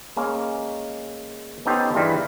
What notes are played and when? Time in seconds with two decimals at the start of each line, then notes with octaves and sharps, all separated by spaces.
0.17 G#3 A#3 C#4
1.65 B3 C#4 D#4 G4 A4 C5
1.94 G2 E3 G3 G#3 A#3 F4